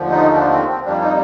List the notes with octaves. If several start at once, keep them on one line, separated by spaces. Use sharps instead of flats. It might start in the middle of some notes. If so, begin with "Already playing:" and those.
Already playing: D#2 D3 F3 A3
D#4
D4
C4
C4
F2 C3 G3 A#3 D4
D#4